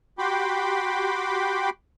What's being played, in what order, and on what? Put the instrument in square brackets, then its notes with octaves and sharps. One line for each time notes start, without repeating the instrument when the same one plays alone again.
[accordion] F#4 G4 G5 B5 C6 D6